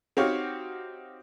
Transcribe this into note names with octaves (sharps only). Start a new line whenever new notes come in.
C4 D#4 F#4 G4 C#5 F5